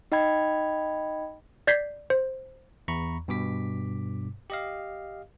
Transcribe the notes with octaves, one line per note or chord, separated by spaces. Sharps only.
D#4 D#5 G5 B5 G#6
D5 G6 G#6 B6 C7
C5
E2 A#5 B5 C#6
G2 B2 D6 B6
G4 D#5 F5